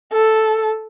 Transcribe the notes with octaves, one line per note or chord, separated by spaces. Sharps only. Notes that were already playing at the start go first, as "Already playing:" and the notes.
A4